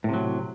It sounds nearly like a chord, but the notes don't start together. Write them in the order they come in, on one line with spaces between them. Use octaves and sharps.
A2 C3 F#3